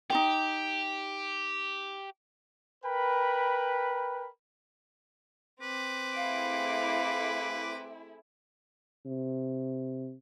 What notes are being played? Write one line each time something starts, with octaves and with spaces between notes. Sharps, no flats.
D#4 F4 G4 G5
A#4 B4 G5 B5
C4 B4 D6
A3 E4 G#4 F5
C3